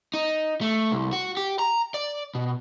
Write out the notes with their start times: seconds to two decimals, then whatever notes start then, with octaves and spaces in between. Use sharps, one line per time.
0.14 D#4
0.61 A3
0.92 C2
1.13 F#4
1.37 G4
1.59 A#5
1.94 D5
2.35 B2